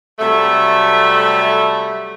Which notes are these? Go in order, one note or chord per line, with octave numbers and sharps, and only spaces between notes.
C3 F#3 G3 A3